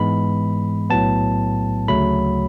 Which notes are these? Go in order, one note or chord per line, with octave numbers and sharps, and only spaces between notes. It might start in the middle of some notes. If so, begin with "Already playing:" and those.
Already playing: G#2 E3 G#3 B3 B5
B1 A2 F#3 B3 A5
D2 C#3 F#3 A3 B5